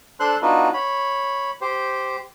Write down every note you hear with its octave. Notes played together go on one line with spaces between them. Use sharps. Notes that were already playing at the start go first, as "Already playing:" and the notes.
D4 A4 C5 C6 F#6
B3 D4 D#4 F4 F#4 B4
C#5 B5
G4 C5